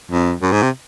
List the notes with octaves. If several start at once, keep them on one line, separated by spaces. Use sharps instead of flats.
F2
F#2
G#2
C3